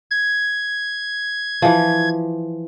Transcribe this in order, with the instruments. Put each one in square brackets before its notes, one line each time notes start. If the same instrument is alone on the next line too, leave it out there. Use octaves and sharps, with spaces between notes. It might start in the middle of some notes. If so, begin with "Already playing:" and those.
[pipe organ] G#6
[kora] E3 F3